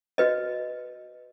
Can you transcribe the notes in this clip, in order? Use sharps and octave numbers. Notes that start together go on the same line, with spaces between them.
F#4 B4 D#5